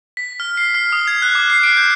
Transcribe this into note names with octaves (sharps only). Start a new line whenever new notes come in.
B6
F6
C7
F6
D#6
G#6
F#6
D6
C7
D7
G6